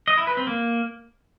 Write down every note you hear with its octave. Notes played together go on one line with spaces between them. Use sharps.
D#5
E4
B4
C4
A#3